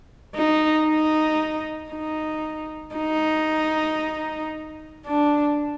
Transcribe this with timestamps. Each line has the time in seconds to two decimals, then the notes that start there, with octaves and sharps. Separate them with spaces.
0.35 D#4
0.87 D#4
1.92 D#4
2.96 D#4
5.06 D4